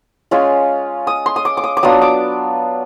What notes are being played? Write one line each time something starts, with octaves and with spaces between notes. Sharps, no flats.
G#3 C#4 F4
D#6
C6
D#6
D6
D6
D#6
D6
F#3 B3 D4 F4 D#6
D6